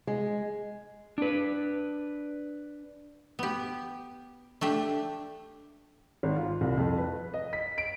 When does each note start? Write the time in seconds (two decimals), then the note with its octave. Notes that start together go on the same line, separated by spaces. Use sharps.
0.07 G#3
1.18 D4 B4
3.39 B3 G4
4.61 A3 D4 G4
6.23 G#1
6.36 F4
6.61 C2
6.78 F2
6.98 B4
7.34 D#5
7.53 B6
7.78 D7